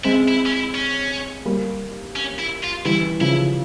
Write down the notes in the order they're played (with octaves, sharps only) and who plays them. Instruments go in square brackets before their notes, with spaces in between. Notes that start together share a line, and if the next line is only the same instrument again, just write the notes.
[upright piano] G#3 C4 [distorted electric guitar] E4
[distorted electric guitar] E4
C#4
E4
C#4
[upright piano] G3 A#3
[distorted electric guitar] C#4
E4
F4
[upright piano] E3 G3 [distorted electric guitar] E4
[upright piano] C#3 F3 [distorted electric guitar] E4